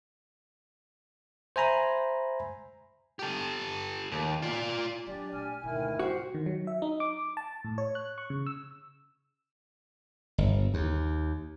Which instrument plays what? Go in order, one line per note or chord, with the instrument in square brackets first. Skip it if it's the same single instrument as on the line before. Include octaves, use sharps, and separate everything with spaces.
[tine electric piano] C5 E5 G#5 A#5 B5
[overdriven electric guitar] G4 A4
D#2
F4 D5
[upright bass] F#3 [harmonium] D4 G4 [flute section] D5 G#5
[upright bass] A#1 A3 [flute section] G#5 F6
[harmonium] D2 D#3 E4 [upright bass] G#2 B2
[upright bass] G3 A#3 [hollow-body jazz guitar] F#4 [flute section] G4 C5
[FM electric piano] D#3
F#3
E5
D#4
D6
A5
A2
C#5
F#6
C#6
C#3
E6
[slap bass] G1
D#2